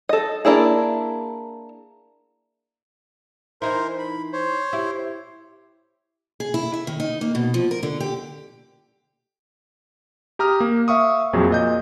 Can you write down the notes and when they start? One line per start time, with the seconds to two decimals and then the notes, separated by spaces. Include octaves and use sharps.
0.09 A4 D#5
0.45 A#3 D4 E4 G#4
3.62 E3 D#4 E4 A#4 C5
3.99 B5
4.33 C5 C#5
4.73 E4 G4
6.40 G#4
6.54 E4
6.74 E5
6.87 D#3
7.00 D#4
7.21 A#3
7.35 B2
7.54 F3
7.71 A#4
7.83 D3
8.00 G4
10.39 G4 A#5 D#6 F6
10.60 A#3
10.88 E5 F5 C#6 D#6
11.33 F2 A#2 F#3 G#4
11.50 A#2 D#5 G6